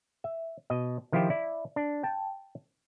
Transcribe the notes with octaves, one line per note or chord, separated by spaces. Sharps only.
E5
B2 D#5
D#3 F3 E4 F4 G4 C5
E4 D5
D4
G5 A5